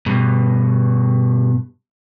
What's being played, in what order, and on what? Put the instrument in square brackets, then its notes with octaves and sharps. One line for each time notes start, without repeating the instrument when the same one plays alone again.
[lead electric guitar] G2 B2